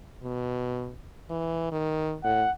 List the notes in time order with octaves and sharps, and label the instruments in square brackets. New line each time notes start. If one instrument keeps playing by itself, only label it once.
[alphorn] B2
E3
D#3
[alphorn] A2 [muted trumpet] F#5